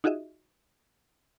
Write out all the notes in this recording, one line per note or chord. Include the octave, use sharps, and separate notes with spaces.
D#4 F4 F#4 G#4 D#5 E5